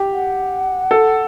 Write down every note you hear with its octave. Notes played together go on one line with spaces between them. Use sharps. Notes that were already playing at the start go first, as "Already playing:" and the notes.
Already playing: G4
F#5
A4